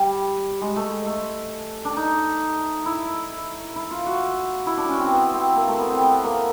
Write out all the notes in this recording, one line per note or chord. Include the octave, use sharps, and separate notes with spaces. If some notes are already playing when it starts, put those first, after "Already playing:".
Already playing: G3
G#3
A3
G#3
A3
D4
D#4
E4
E4
F4
F#4
E4
D4
C#4
C4
B3
C4
A#3
A3
B3
C4
B3
A#3